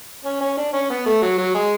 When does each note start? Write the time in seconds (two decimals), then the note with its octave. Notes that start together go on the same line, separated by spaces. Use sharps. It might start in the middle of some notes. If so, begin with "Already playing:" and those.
0.24 C#4
0.40 C#4
0.57 D4
0.73 C#4
0.90 B3
1.06 A3
1.22 F#3
1.38 F#3
1.54 G#3